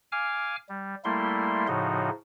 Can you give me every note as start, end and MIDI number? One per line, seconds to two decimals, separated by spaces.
0.12 0.56 77
0.12 0.56 80
0.12 0.56 86
0.12 0.56 89
0.69 0.95 55
1.04 1.67 55
1.04 1.67 57
1.04 1.67 58
1.04 1.67 64
1.04 1.67 84
1.68 2.10 45
1.68 2.10 49
1.68 2.10 53
1.68 2.10 63
1.68 2.10 66